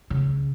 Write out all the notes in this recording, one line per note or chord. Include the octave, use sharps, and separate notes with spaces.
C#3